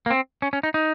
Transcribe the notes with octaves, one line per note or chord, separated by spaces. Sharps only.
A#3
C4
C#4
C#4
D#4
D#4